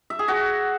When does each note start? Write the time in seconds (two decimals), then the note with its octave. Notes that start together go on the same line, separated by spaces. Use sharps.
0.10 E5
0.19 G#4
0.28 F#4